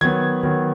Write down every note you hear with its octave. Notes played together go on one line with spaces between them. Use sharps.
D#3 F#3 B3 G#6
D#3 F#3 B3